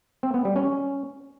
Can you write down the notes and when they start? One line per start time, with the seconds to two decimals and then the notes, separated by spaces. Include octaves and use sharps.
0.23 C4
0.34 B3
0.45 G3
0.56 C#4